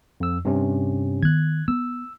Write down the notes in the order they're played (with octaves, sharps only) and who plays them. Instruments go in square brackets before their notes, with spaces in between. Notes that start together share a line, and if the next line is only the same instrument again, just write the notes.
[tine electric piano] F2 E6
G2 C3 C#4
[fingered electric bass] D#3 B3 [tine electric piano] F#6 G#6
[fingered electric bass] B3 [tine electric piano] E6